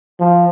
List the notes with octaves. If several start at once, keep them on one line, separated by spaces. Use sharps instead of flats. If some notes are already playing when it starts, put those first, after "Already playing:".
F3